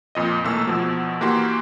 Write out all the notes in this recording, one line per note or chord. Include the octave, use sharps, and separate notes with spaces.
F2 A#2 D#5
B1 E3 A3 A#3 E6
E2 B2 F3
E3 A#3 F#4 G4 C6